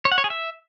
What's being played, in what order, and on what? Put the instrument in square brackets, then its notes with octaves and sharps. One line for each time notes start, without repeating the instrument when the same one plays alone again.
[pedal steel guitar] C#5
F#5
C#5
G#4
E5